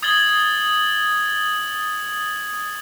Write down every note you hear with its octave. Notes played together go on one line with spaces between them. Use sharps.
D#6 G#6 A6 F#7 G7